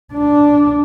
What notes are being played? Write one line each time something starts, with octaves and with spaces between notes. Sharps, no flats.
D4